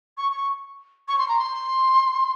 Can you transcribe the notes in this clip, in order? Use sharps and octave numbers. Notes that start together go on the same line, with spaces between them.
C#6
C#6
C#6
C6
A#5
C6